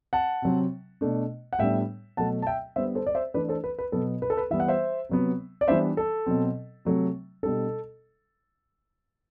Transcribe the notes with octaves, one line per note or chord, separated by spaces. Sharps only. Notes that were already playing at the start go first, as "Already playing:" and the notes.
F#5 A5
C3 F#3 C4
B2 A3 D4
F#5
A2 G3 B3 D4 E5 G5
B2 F#3 A3 F#5 A5
A5
E5 G5
D3 G3 B3 C5 E5
A4 C5
D5
C5 E5
E3 A3 D4 B4 D5
A4 C5
B4
B4
B2 F#3 B3 A4
B4
A4
B4
E3 G3 B3 E5
F#5
C5 E5
C3 F#3 B3
D5
E3 G3 B3 D4 C5 E5
A4
B2 F#3 C4
C3 F#3 A3
B2 G3 D4 A4